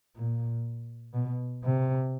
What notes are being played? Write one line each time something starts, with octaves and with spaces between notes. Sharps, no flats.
A#2
B2
C3